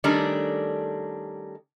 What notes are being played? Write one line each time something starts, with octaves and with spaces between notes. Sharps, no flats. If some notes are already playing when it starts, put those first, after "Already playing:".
D#3 G3 A3 C#4 D4